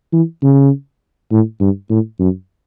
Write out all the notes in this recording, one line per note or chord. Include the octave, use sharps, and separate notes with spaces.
E3
C#3
A2
G2
A2
F#2